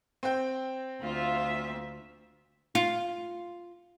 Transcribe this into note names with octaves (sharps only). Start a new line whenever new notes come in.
C4 G5
D2 F4 E5
F4